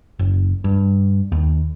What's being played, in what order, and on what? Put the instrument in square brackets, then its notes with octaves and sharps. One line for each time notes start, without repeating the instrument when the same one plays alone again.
[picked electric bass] F#1
G2
D#2